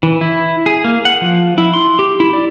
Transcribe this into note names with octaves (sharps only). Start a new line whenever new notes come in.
E3
E4
G#4
A#3
F#5
F3
E4
C6
G4
E4
D5